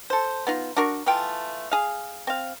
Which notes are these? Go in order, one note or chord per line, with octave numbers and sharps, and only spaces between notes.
A4 C5
B3 D#4 F4
D4 F#4 A#4 C#6
E3 A3 F4 G5
G#4 F5
C4 F5